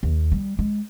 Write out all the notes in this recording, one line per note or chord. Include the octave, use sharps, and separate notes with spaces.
D#2
G3
G#3